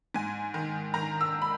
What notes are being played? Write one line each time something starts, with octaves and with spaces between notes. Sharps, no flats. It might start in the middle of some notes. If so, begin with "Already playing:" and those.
G#2 G#5
D#3
D#3 A#5
E6
B5